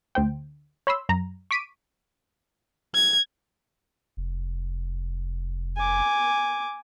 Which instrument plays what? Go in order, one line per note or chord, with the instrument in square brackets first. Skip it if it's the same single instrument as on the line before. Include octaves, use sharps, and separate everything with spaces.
[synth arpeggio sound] D2 C5 G5
C#5 B5 C6 E6
F#2 A#5
C#6 D6 B6 D7 D#7
[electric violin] G#6
[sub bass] F1
[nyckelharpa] G#5 D6